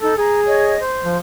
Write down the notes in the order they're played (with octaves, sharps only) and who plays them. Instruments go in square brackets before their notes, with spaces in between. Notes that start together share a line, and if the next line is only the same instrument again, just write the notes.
[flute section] D#4 [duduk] A4
[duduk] G#4 [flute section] A#5
[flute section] C#5 D#5
C5
[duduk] F3